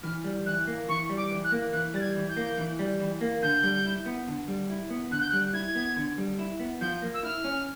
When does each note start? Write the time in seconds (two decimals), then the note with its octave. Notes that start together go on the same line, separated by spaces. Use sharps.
0.03 E3 F6
0.24 G3
0.46 E3 F#6
0.67 A#3
0.88 E3 C#6
1.09 G3
1.17 D6
1.31 E3
1.44 F#6
1.52 A#3
1.73 E3 F#6
1.94 G3 A6
2.01 G#6
2.15 E3
2.29 G6
2.36 A#3
2.58 E3
2.79 G3
3.00 E3
3.21 A#3
3.42 D3 G6
3.63 G3
3.85 E4
4.06 B3
4.28 D3
4.48 G3
4.70 E4
4.90 B3
5.11 D3 F#6
5.21 G6
5.30 F#6
5.33 G3
5.53 E4 G#6
5.75 B3
5.96 D3
6.18 G3
6.39 E4
6.60 B3
6.81 F3 G6
7.02 A#3
7.14 E6
7.23 E4 F6
7.44 C#4